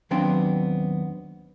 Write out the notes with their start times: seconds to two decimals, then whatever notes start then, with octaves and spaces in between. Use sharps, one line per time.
0.11 D#2 F#3 B3 C4 D4 G5